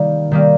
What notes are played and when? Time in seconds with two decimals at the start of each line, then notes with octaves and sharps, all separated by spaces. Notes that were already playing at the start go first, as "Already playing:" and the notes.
Already playing: D#3 G3 A#3
0.31 D#3 G3 A#3